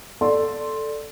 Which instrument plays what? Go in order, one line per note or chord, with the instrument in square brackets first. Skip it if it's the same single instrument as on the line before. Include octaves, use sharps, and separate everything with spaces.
[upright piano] A4 D5 C6